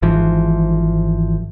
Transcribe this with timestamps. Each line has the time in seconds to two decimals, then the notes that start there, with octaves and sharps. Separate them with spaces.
0.02 G#1 G#2 E3 F3